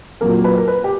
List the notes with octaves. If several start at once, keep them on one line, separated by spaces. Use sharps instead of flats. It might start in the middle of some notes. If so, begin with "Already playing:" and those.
A#2 F#3 A#3 A#4
B4
A#4
B4
G4